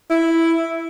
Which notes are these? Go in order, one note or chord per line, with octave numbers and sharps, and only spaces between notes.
E4